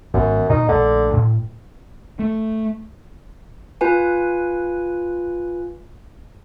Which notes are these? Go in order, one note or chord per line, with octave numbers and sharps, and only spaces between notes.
G#1 F#2 B3
A#2 D#4
A#1 D3 A3 D4
A2
A3
F4 B4 G#5